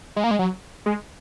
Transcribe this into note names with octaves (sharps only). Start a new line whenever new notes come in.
G#3
A#3
G#3
F#3
G#3